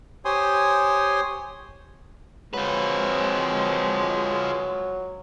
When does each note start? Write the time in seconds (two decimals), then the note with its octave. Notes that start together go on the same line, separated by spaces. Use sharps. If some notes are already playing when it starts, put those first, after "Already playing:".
0.25 G4 C5 C#5 G#5 C6 D#6
2.54 D#3 F3 F#3 G#3 C4 F4 B4